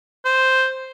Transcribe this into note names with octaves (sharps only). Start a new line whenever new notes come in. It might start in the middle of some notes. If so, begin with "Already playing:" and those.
C5